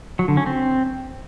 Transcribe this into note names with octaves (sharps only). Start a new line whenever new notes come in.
F#3
D3
C#4
C4